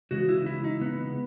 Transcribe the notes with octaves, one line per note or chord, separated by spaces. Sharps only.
C#3 E3 G#3 F#4
E4
E4
D#4
B3